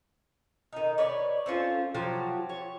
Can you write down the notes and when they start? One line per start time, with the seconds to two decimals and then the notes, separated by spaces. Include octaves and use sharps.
0.73 D#3 D#4
0.98 B4 C#5 D5
1.46 C4 C#4 F4 A4
1.95 F3 F#3 F#4 G4
2.49 C#5